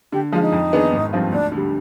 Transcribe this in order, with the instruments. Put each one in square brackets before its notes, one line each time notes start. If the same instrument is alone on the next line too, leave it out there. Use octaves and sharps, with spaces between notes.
[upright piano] D3 [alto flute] G4
[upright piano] F3 G#3 [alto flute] F4
[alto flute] D#4
[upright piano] F2
D#3 B3 D4 G#4
G#1
G2 F3 C4 F4
[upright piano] D2 [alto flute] D4
[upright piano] D3
G3